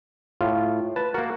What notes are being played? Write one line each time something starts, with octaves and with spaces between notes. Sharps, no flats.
A2 F4
B4 A5
A#3 F#4 A#4